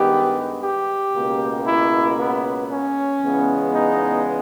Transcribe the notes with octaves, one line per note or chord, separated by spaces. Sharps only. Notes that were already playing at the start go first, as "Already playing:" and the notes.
Already playing: G2 D#3 G#3 B3 G4
G4
C#2 B2 A#3
E4
B3
C#4
E2 C#3 G#3 B3
D#4